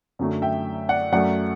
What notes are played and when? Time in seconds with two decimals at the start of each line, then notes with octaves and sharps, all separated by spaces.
0.19 F#2 D3 F#3 A3
0.42 E5 G5
0.89 D5 F#5
1.12 F#2 F#3 A3 D5 F#5